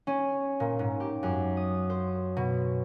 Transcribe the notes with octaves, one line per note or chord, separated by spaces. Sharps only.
C#4
A#2
G#2
G4
F#2
D#6
C5
B2